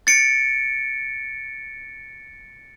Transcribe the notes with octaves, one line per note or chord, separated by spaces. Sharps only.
A6 C#7 D7